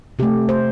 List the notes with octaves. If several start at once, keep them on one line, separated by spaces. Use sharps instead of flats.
C3 A3 G4
C5